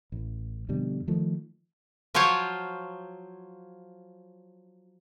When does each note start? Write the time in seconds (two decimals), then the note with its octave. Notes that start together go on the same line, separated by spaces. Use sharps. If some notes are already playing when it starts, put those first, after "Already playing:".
0.12 A1
0.69 F2 B2 D3 G3
1.08 D#3 F3 A3
2.14 F3 F#3 F4 C5 C#5